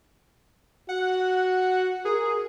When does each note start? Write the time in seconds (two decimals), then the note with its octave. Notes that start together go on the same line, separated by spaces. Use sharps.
0.89 F#4 F#5
2.05 G#4 A#4